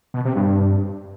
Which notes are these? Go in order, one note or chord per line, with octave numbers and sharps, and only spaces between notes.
B2
C3
G2